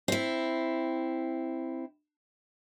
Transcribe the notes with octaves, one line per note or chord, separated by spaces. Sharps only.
C4 E4